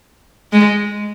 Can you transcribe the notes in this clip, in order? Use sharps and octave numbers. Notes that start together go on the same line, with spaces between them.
G#3